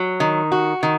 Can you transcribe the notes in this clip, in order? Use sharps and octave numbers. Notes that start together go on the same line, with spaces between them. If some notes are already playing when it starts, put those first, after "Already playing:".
Already playing: F#3
D#3
F#4
D#3